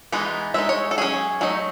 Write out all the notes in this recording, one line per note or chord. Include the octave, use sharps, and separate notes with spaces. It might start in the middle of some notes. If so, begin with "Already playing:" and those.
E3 G#3 B3 D#4
G#3 D#4 E5
C#5
A4
F#3 C#4 G#4
F#3 A3 D#4